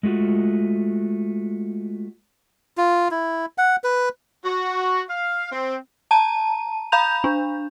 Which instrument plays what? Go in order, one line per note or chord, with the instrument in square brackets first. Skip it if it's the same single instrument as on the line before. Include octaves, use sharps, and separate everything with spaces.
[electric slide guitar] G#3 A3 F4 F#4
[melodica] F4
E4
F#5
B4
[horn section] F#4
F5
C4
[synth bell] A5 A#5 D#7
F5 A#5 B5 G6 F7
D4